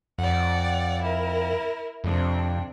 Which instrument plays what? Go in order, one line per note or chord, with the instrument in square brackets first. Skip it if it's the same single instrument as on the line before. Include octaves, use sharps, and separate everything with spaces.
[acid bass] F2 [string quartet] D5 F#5
[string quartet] E4 A#4
[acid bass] F2 [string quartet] C3 D4